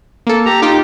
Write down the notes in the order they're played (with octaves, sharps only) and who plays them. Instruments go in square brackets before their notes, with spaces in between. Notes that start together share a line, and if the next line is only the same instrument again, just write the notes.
[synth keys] A#3 A4
[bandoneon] G4 A#5
[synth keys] D#4 F4 G4 [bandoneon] G5 D6